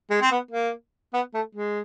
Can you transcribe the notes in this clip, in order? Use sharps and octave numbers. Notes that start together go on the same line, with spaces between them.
G#3
C4
B3
A#3
B3
A3
G#3